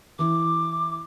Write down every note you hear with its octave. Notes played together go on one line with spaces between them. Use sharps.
E3 D6